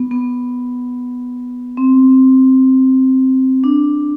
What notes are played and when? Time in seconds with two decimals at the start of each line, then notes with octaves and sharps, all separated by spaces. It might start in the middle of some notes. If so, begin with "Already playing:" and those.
Already playing: B3
0.11 B3
1.77 C4
3.64 D4